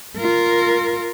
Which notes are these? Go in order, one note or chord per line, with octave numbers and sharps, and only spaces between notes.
F4 A#4